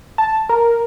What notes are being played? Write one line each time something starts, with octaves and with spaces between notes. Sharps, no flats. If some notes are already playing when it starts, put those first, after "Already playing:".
A5
A#4